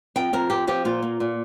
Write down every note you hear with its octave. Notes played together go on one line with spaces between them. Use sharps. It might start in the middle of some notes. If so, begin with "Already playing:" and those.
F2 G5
F2 A#4
C4 G4
F3 G4
A#2 F4
A#3
A#2